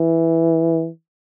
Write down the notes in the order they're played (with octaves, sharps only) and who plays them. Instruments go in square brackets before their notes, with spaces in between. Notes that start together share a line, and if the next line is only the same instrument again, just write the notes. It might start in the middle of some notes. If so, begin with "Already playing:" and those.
Already playing: [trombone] E3